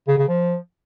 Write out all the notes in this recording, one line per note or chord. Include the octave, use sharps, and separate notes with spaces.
C#3
C#3
F3